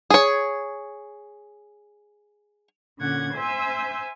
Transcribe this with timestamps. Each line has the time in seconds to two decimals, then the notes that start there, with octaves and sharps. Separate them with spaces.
0.10 G#4 C#5
2.99 A#2 D3 C#4 F#5 G#6
3.34 C5 E5 G#5 E6 G6